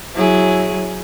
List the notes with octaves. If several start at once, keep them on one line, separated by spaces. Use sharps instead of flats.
F#3 E4 G#4